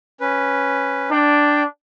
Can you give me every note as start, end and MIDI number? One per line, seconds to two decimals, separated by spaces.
0.21 1.10 61
0.21 1.10 71
1.11 1.63 62
1.11 1.63 79